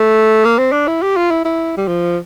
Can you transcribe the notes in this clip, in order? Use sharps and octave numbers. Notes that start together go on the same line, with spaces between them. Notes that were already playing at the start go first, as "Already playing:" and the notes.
Already playing: A3
A#3
C4
D4
E4
G4
F4
E4
E4
G3
F3